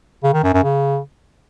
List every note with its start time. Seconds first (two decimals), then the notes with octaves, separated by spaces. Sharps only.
0.23 C#3
0.33 D#3
0.43 F#2
0.53 F#2
0.64 C#3